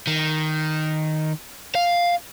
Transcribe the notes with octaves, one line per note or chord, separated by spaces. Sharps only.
D#3
F5